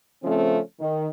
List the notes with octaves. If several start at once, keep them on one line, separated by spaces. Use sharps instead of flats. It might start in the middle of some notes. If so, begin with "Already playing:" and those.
C#3 F3 A3 C4 C#4
D#3